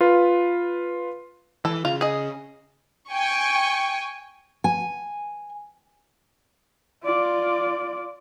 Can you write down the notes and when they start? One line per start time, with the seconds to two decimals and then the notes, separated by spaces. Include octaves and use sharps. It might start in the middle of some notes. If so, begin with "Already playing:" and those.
0.01 F4 B4
1.65 E3 A4
1.85 C#3 F4
2.01 G#4 D#5
3.10 G5 G#5 C#6
4.64 G#5
7.03 F4 D5